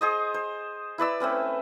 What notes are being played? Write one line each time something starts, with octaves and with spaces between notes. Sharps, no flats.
G#4 C5 D#5
C5
E4 B4 D5 E6
A3 C4 C#4 B4